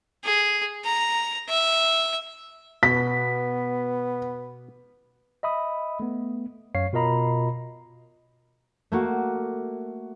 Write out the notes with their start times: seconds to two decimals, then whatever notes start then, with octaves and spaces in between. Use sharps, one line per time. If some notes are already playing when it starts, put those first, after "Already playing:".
0.24 G#4
0.85 A#5
1.49 E5
2.83 B2 B3 B6
5.43 D#5 E5 B5 D#6
6.00 A3 B3
6.75 F#2 C#5 F5 C7
6.93 B2 F4 A#4 D#5 A#5 B5
8.92 A3 A#3 F#4